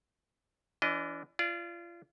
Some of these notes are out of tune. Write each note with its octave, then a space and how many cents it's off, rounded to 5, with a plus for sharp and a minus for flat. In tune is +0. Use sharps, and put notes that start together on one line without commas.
E3 +30 D4 -30 D#5 +0
F4 -30 D5 +0